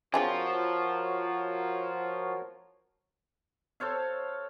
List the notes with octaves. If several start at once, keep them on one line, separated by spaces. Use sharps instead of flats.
F3 C4 D4 F4 F#4 G#4 A#4 C#5
A4 C5 C#5 F5